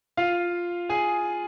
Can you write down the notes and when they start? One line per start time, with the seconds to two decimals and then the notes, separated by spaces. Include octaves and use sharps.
0.17 F4 F5
0.89 G#4 G#5